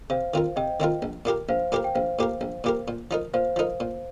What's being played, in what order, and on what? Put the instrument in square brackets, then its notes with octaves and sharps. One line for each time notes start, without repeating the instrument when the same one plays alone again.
[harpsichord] C3 [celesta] C5 F5
[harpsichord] D#3 C4 F4 A#4
[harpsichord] C3 [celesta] D#5 G5
[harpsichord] D#3 C4 F4 A#4
A#1
A#2 A#3 G4 A#4
[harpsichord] A#1 [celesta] C5 F5
[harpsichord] A#2 A#3 G4 A#4
[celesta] G5
[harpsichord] A#1 [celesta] C5 F5
[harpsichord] A#2 A#3 G4 A#4
A#1
A#2 A#3 G4 A#4
A#2
F3 D#4 A#4
[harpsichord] A#2 [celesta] C5 F5
[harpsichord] F3 D#4 A#4
A#2